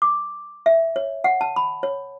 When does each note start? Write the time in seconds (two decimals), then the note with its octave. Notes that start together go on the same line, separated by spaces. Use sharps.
0.02 D6
0.66 E5
0.96 C#5
1.24 F#5
1.41 A5
1.56 B5
1.83 C#5